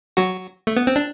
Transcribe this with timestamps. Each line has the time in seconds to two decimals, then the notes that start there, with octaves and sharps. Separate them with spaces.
0.17 F#3 F#4
0.67 A3
0.77 B3
0.87 C4
0.96 D4